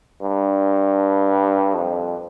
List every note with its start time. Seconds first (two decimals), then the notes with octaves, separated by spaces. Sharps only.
0.22 G2
1.74 F2